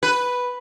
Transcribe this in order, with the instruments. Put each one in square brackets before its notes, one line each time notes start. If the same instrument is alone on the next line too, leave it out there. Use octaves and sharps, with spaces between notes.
[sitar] B4